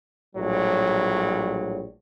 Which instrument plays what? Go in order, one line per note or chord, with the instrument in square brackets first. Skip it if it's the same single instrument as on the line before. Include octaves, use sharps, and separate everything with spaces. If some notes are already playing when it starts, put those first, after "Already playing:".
[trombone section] A#1 A2 F#3 G3